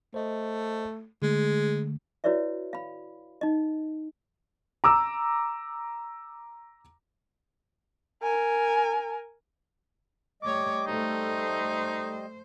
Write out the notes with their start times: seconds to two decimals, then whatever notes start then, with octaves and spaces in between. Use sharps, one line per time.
0.14 A3 C5 D#5
1.22 D3 G#3 A3
2.24 E4 F#4 B4 C#5 D5 E5
2.73 F5 B5
3.41 D#4 D#5
4.84 A#5 D6 E6
8.23 A#4 G#5
10.42 G3 A3 C#5 D#5 D6
10.87 A3 D#4 C5